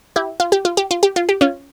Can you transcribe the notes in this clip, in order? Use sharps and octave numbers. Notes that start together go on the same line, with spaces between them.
E4 G4
F4
G4
F4
G4
F4
G4
F4
G4
C#4 F4